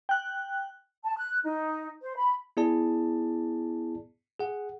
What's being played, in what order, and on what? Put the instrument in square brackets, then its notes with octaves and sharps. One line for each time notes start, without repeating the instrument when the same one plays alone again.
[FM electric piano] G5 F#6
[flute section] A5
F#6
D#4
C5
B5
[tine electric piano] B3 E4 G#4 D5 A5
G#4 F#5